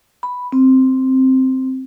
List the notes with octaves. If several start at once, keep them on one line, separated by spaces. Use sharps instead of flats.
B5
C4